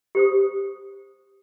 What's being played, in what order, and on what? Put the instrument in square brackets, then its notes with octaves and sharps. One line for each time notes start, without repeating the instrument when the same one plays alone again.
[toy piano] G4 C5 D#6